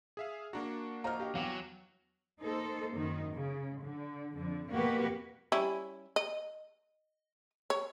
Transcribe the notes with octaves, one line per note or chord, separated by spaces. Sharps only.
G#4 E5 F5
A#3 D4 F#4 A#5
F4 C5 D#5 A#5 F6
G4 D#5 F5
E2 F#3 F5 G5 D6
A#3 D#4 A4 C5
F#2 D#3 D#4
C#3
D3
F2 D3
F2 B2 A#3 F#4 G4 B4
G3 C#4 E4
D#5
C#5